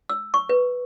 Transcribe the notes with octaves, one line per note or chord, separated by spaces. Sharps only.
E6
C#6
B4